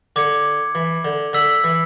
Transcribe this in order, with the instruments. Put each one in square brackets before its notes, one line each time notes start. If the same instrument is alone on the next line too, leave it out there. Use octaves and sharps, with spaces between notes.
[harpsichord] D3 [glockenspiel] D6 G#6 C#7
[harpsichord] E3
D3
[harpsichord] D3 [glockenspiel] E6 B6 F#7
[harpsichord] E3